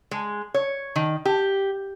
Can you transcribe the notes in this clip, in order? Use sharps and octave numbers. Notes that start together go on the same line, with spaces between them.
G#3
C#5
D#3
G4